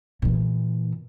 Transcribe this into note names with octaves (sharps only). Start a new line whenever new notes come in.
A#2 E3